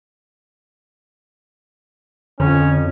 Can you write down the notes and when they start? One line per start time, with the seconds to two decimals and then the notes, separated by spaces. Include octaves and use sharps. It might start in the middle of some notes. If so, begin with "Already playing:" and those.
2.40 F2 D3 C#4